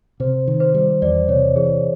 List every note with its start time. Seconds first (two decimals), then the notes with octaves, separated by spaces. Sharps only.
0.20 C3 C5
0.47 D#3
0.60 C5
0.74 G3
1.02 E2 D5
1.28 C3 C#5
1.56 E3 G#4